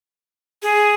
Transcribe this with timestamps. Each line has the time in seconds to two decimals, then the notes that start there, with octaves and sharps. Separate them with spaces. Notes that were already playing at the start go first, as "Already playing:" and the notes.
0.63 G#4